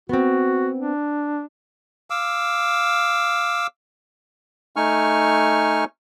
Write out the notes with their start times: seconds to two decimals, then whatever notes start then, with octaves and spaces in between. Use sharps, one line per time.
0.09 B3 C4 F#4
0.78 D4
2.10 F5 D6 E6
4.76 A3 D#4 G#5 C#6 F6